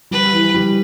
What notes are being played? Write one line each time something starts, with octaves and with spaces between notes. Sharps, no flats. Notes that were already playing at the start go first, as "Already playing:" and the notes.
G3 B4
E3
G3